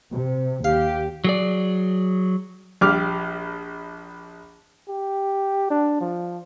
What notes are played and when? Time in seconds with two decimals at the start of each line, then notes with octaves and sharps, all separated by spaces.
0.11 C3
0.64 D#2 G4 F5
1.24 F#3 G#4 D5
2.81 A#1 G3 D6 F6
4.89 G4
5.70 D4
6.01 F3